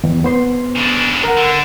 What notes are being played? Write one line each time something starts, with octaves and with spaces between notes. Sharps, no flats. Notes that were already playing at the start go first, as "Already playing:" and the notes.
E2
B3 C5 C6
C#3 D4
A#4 F#5
D3